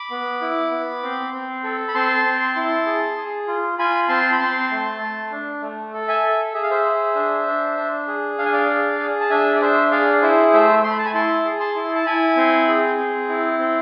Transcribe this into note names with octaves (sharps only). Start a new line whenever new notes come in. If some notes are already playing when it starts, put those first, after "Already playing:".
Already playing: B5 D6
B3
E4
B3
C4
C4
A4
B5
C4 A5 C6
C4
E4
G#4
G#4
F4
F4 G#5 B5
C4 A5 C6
B5
C4 A5 C6
A3
A3
D4
A3
A4
E5 G#5
A4
G#4 E5
F5
C5 E5
G#4
D4
D4
D4
G#4
D4 F5
G#5
D5 F5
G#4
G#4
A5
D4 E5 G#5
D5
D4 C5 E5
G#4 D5 F5
E4 C5 E5
A3 C5 E5
A3 C6
B5
A5
G#5 B5
E4 A5 C6
G#4
A5 C6
E4
A5
E4 G#5 B5
C4
G#4
C4
E4
C4